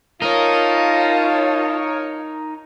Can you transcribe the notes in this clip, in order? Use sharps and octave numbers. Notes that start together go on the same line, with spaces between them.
D#4 F4 A#4 C#5 A5